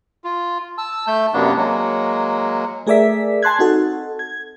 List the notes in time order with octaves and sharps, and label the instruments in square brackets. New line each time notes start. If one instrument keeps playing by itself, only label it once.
[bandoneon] F4
A5 E6
A3 A5 G6
F#2 C3 A#3 B3 D4
F#3 G#3 A#3
[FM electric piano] A3 G#4 A#4 D5 E5 B6
G#5 A5 C6 F#6 G#6
C4 D#4 F#4 A4
G#6